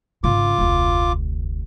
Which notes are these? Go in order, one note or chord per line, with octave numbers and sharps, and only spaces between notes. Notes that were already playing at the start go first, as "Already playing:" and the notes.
G#1 C#3 F4 D6
F1 D2